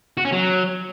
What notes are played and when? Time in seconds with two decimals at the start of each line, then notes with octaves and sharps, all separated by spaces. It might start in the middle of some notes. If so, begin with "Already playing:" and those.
0.17 F#4
0.25 C#4
0.32 F#3